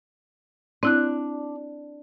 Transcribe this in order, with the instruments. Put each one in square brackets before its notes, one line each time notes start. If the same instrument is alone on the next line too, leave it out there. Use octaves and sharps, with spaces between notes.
[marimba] C4 E4 F#6 [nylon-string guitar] D4